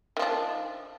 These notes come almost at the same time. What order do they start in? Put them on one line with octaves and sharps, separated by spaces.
D#3 F3 D4